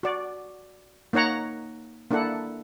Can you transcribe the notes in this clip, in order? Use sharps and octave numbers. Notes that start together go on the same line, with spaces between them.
F#4 D5
A#3 D#4 C#5 F#5 A#5
A#3 D4 E4 A4 F#5